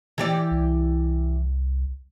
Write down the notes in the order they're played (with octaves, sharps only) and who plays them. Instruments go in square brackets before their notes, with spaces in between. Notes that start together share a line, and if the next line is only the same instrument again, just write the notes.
[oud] E3 G4 D5
[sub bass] C2